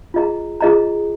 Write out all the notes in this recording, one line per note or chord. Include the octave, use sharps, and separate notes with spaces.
F4 G#4 D#5 A#5
F4 G#4 D#5 A#5